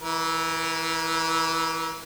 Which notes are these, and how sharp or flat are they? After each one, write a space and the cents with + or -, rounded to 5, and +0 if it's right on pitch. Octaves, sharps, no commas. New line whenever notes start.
E3 -10 A#4 +35